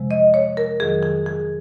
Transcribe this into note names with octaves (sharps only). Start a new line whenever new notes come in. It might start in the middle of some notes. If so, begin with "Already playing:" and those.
Already playing: F2 C3 F3 G#3
D#5
C#5
A#4
F2 D#3 F#3 G#4
G#4
G#4